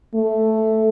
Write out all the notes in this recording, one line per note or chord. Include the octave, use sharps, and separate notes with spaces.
A3